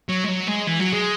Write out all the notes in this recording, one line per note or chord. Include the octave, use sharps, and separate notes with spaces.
F#3
G#3
F#3
G#3
E3
F#3
G#3